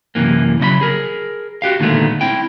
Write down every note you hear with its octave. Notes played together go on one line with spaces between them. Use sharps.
F#2 C3 E3 A#3
C#3 F#3 D#5 B5
G#4 A#4
F#4 G4 F5
A#2 D3 D#3 G#3 A3 B3
C4 E4 G5